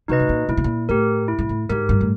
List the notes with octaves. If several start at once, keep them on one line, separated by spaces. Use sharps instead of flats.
C3 D#4 F#4 B4 D#5
A2
A#2
A#2 E4
B2
A#2
A2 G4 A#4
E4
G#2
A2
G#2 G4 A#4
G2
A2